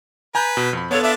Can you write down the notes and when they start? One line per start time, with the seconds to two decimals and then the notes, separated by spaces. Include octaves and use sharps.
0.35 B4 G#5 A#5 G6
0.57 B2
0.73 F2 B5
0.91 B3 D4 F4 A4 C#5
1.03 D4 F4 D5 E5